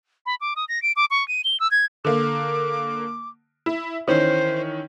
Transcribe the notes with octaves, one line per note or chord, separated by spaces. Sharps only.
B5
D6
D#6
A#6
D7
D6
C#6
D#7
G7
E6
G#6
D3 A#3 D6
E4
D#3 E3 C#4 C5